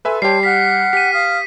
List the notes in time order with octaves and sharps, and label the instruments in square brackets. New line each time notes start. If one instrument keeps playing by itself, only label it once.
[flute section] A4 C6 [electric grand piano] B4 E5 G#5
[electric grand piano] G3 G4 [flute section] C#5 A5 C6 [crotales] C7
[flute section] F#5 F6 F#6 [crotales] B6
[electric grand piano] G4 [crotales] B6 D#7
[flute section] F5 D#6 F6